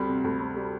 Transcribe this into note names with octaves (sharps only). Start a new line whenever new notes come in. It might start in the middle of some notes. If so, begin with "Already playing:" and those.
Already playing: D2 G3 C4 B5
C3
D2
C4
G3